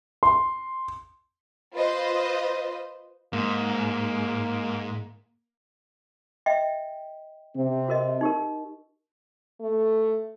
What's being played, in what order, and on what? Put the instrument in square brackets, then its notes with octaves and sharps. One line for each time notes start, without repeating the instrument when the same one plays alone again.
[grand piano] C6
[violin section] F4 B4 C5 D#5
[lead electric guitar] G#2 [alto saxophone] A#3
[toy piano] D#5 E5 G5
[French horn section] C3 C4
[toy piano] F#4 A#4 D#5
D#4 G4 A#4
[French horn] A3